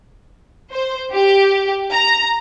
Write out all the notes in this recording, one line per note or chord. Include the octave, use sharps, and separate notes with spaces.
C5
G4
A#5